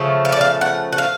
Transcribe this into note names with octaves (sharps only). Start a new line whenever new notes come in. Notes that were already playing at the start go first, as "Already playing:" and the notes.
Already playing: C#3 F3 A3
F5
D5
F5
F#5
F#5
F5